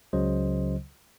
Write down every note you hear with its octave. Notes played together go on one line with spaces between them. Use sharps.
C#2 C#3 F#3 C5 D#5